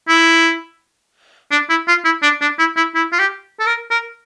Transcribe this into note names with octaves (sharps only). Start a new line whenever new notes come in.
E4
D4
E4
F4
E4
D4
D4
E4
E4
E4
F4
G4
A4
A#4
A#4